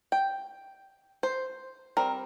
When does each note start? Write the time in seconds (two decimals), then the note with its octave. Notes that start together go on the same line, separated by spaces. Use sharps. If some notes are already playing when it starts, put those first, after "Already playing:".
0.12 G5
1.23 C5
1.97 G3 C4 A#4